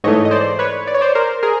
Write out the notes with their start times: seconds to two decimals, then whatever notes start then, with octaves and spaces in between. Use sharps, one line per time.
0.04 G#2 E3 A3 C#5 D#5
0.25 D#5
0.31 C5 D5
0.59 B4 C#5
0.87 D5
0.94 C#5
1.01 C5 D5
1.15 A#4 C5
1.43 G#4 A#4